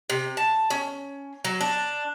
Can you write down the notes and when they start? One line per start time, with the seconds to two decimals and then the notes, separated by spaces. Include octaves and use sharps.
0.10 C3
0.37 A5
0.70 C#4
1.45 F#3
1.61 D4